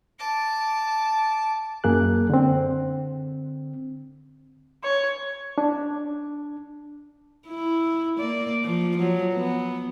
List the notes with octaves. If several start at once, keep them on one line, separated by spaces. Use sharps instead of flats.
A5 D6
F#2 A#3 G#4 F#6
D3 C4
C#5
D4
E4
A#3 D5
F3
F3 F#3
B3